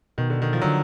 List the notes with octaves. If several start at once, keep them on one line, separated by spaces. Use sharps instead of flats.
B2 D#3
D3
D#3
F3
D3 F#3